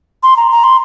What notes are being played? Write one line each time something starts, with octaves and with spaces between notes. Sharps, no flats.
C6
A#5
A#5
C6